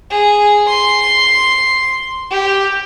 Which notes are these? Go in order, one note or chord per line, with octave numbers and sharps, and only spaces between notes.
G#4
C6
G4